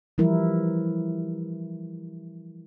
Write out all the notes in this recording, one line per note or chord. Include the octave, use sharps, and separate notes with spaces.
E3 F3 G3 E4 A#4